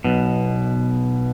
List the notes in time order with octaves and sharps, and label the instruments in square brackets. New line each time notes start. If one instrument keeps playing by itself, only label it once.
[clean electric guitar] B1 B2